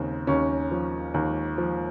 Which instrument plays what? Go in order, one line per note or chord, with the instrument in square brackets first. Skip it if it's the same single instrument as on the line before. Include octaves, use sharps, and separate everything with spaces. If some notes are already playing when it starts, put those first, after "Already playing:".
Already playing: [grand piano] D#2 C#3 C4
D#2 C#4
F3
D#2
F3